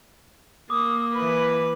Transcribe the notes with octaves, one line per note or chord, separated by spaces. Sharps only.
A#3 D6 D#6
E3 B4 B5